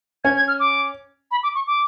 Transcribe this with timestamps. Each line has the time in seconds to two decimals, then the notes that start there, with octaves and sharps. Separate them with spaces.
0.24 C#4 G#6
0.36 G#6
0.48 F6
0.60 D6
1.31 B5
1.43 D6
1.55 C#6
1.67 D6